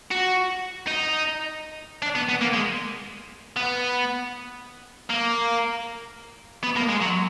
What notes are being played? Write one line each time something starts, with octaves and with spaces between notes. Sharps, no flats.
F#4
D#4
D4
B3
B3
A#3
G#3
B3
A#3
B3
A#3
G#3
F#3